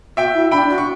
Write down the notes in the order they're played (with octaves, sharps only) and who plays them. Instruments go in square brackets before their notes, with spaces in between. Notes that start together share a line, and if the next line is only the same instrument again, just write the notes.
[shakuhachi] F#4 [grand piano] E5 G5
[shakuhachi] E4
[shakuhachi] D4 [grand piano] G5 B5
[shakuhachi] F#4
[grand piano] C#6